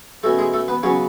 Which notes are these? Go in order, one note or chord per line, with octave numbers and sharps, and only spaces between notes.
B2 A3 C#4 A4
G#3 G#4
A3 A4
B3 B4
C#3 F#3 B3 C#4 C#5